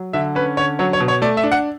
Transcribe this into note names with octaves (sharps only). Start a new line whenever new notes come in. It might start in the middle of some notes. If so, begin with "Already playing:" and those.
Already playing: F#3
D3 E5
C#4 B4
D3 C#5
F#3 C#5
C#5
B2
C#5
A3 D5
E5
D4
F#5